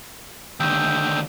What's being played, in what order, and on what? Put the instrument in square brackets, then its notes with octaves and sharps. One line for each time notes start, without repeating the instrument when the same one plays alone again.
[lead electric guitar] D#2 D3 [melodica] G5 D#6 E6